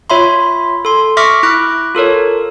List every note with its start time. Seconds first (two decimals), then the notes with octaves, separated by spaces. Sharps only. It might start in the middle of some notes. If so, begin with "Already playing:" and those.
0.10 F4 C#5 E5 B5 C6
0.85 A4 C6
1.17 E5 C#6 D6 F6 A#6 B6
1.43 E4 D6 F#6
1.95 F4 A4 A#4 C#5